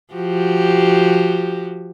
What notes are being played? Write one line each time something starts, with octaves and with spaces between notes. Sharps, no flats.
F3 F#4 G4